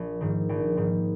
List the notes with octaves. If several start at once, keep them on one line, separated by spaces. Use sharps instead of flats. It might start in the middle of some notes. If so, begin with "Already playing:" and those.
Already playing: A#1
G#2 D#3
A#1 G5
G#2 D#3